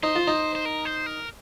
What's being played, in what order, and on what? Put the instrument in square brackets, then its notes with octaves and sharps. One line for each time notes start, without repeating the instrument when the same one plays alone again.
[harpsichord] D#4 [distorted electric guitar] C5
[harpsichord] F4
D#4
[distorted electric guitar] C5
A#4
C5
A#4